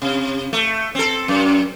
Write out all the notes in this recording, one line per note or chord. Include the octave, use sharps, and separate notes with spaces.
C3
A3
C4 A4
F#2